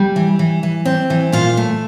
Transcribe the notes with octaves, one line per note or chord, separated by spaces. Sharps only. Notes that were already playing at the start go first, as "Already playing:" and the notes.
Already playing: G3
E3
E3
E3
C4
E3
A#2 F4
A3